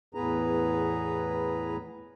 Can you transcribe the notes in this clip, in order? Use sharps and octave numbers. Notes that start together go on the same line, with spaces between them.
E2 A2 B3 G#4 B4 A#5